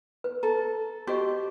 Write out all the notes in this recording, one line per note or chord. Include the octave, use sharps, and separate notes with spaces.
B4
A4 A#5
F#4 G4 C5 D#5 C#6